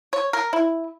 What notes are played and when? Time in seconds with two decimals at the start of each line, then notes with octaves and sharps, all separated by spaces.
0.13 C#5
0.33 A#4
0.53 E4